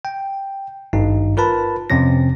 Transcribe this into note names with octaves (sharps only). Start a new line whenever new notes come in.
G5
G#1 G2 D#4
F4 A#4 B4 A5 B5
F2 C3 C4 C#4 A#6